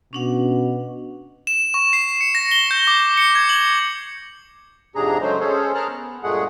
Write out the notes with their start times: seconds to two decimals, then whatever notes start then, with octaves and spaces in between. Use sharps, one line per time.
0.13 B2 C#4 D4 F#5
1.47 E7
1.74 C#6
1.93 C7
2.21 C#7
2.35 A#6
2.51 G7
2.71 G6
2.87 D6
3.17 C#7
3.35 G#6
3.49 F#7
4.95 F2 G#2 C3 D4 G#4 A#5
5.21 C#3 F#3 G#3 A3 C5
5.40 C#4 G#4 A4 C5 C#5
5.75 G#4 A#4 A5 A#5 F6 F#6
5.90 B3
6.23 G2 A#2 G#3 A3 G#4 F#5